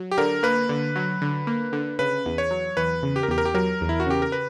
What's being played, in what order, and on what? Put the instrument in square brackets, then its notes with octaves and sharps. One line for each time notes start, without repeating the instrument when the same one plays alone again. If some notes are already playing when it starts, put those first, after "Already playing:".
Already playing: [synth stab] F#3
[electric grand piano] G4
[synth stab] D3 [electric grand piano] A#4
[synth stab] A#3 [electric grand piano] B4
[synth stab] D3
F#3
D3
A#3
D3
[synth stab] C#3 [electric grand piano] B4
[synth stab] E2
[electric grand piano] C#5
[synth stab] F#3
[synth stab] E2 [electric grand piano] B4
[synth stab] C#3
[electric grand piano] G4
A#4
[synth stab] E2 [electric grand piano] G4
[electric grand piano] A#4
G4
[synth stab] F#3 [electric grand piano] A#4
[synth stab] E2
[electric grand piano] E4
F#4
[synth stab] C#3 [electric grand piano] G4
[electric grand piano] A#4
B4